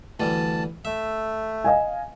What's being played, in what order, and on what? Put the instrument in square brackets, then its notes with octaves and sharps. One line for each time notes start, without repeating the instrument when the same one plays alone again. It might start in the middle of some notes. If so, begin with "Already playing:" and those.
[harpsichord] D2 E3 G3 [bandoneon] A5
[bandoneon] A3 [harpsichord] E5
[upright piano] D#5 F5 G#5